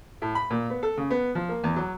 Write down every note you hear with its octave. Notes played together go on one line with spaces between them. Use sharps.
A2
B5
A#2
B3
A4
C#3
B3
F3
A#3
E2
F#3